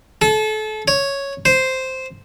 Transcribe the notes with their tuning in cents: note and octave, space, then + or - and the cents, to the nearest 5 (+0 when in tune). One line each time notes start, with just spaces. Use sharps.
A4 -30
C#5 +0
C5 -5